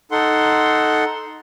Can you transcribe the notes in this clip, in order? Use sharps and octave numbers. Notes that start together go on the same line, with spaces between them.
D#4 A4 F#5 C6